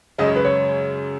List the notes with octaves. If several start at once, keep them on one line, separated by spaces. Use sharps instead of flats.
F#2 C#3 G#3 C#4 D#5
C#5
B4
C#5